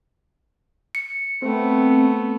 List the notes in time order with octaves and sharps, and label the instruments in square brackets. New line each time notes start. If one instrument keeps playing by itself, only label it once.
[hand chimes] C#7
[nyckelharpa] A3 B3 [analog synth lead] C4